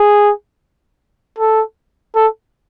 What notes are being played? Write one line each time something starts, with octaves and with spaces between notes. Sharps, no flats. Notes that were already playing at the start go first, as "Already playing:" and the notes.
Already playing: G#4
A4
A4